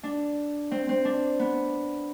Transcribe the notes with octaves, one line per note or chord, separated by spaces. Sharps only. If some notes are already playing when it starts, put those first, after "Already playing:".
D4
C4
C4
D4
B3